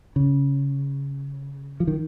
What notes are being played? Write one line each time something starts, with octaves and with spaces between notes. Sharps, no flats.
C#3
F3
D#3